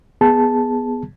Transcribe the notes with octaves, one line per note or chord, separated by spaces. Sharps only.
B3 G#4 A5